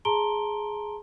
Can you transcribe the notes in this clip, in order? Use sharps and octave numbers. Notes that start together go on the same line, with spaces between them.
G#4 A5 A#5 C6 D7 G7